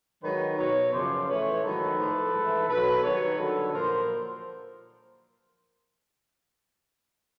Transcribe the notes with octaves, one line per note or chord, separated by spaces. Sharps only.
G#2 D#3 F#3 B4 C#5
B2 F#3 B4 C#5
F#2 C#3 F3 C5 D5
A2 E3 B4 C#5
G#2 D#3 F#3 A4 B4
A2 F3
G#2
E3
B2 F#3 A4 B4
G2 D#3 F#3 B4 C#5
G2 D3 F#3 A4 B4
A#2 F3 A#4 C5